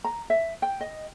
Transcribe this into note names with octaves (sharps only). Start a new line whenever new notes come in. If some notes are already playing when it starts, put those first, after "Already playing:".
A#5
E5
G5
D#5